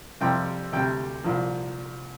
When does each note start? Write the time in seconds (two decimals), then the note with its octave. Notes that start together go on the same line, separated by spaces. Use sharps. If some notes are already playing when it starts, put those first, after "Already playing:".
0.21 F2 C3 G3 G5
0.72 D2 C3 G3 G5
1.24 C2 A#2 F3